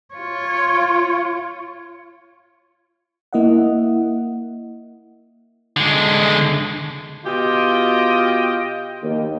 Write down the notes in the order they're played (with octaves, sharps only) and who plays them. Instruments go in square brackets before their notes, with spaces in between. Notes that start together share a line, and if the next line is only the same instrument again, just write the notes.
[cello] F4 C#5
[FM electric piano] A#3 E4 D#5 E5 F#5
[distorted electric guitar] D3 G#3
[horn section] B2 F4 G4 D#5 G5
[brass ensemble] D#2